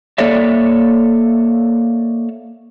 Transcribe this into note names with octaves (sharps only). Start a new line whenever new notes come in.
A#3 A4 C#5 D5 E5